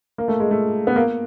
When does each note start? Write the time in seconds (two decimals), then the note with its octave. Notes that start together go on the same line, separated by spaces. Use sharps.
0.18 A#3
0.28 A3
0.40 G#3
0.51 A3
0.87 B3
0.96 A#3